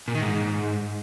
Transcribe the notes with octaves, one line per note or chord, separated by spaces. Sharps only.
A#2
D#3
G#2